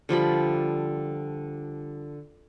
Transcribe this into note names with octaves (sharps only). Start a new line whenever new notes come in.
D3 F3 G3 B5